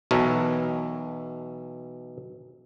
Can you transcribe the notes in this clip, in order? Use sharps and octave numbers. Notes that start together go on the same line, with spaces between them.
B1 B2 E3 A4 A#4 C#5